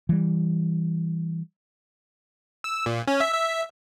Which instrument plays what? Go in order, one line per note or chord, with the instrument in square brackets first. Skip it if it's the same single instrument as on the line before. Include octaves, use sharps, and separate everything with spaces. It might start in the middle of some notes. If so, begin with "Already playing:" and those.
[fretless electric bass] E3 G3
[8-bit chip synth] E6
A#2
C#4
E5
E5